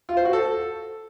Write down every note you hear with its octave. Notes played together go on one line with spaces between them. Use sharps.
F4
C5
F#4
A4